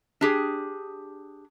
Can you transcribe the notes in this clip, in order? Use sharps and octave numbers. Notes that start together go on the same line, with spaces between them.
D4 G4 G#4